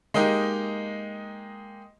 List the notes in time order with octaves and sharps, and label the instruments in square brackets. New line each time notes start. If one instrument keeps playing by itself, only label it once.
[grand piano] G#3 A#3 D#4 G4